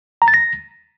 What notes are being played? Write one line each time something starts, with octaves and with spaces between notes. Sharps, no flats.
A#5
A6
A#6